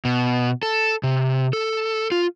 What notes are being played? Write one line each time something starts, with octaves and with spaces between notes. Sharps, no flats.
B2
A4
C3
A4
F4